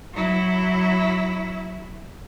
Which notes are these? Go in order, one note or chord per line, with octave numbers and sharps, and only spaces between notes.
F#3 E4